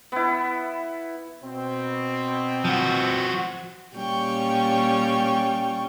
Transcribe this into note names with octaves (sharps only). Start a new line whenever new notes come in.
B3 E4
B2 C4
F3 F#4
A#2 G3 C#4 G5 C#6